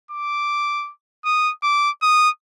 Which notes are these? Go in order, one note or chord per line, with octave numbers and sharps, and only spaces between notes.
D6
D#6
D6
D#6